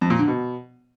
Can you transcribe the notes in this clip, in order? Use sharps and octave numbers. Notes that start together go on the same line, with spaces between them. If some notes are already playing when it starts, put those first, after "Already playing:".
F2
A#2
D3
B2